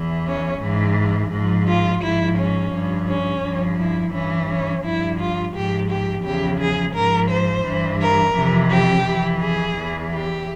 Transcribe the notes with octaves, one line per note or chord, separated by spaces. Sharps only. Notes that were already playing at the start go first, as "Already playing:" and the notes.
Already playing: E2 E3
C#4
G#2 E3
G#2 F3
F4
G#2 F3 E4
C#4
G2 F3
C#4
G2 F3
E4
G2 E3 C#4
C#4
G2 F3 E4
F4
G#2 F3 G4
G4
E2 C#3 F3 G4
G#4
G#2 F3 A#4
C5
G2 E3
A#4
F2 C3 E3
G4
F2 E3
G#4
E2 E3
G4